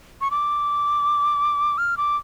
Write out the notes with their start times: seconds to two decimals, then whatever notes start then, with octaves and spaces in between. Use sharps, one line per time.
0.21 C#6
0.31 D6
1.78 F6
1.97 D6